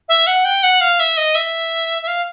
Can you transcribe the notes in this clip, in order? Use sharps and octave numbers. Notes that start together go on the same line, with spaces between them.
E5
F#5
G5
F#5
F5
E5
D#5
E5
E5
F5